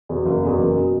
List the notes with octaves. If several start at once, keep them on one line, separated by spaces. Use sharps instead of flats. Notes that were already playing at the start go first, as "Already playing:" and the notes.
E2 B2
F#1
E2 B2
F#1
B2